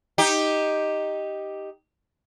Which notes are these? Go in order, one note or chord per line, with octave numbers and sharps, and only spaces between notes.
D#4 G4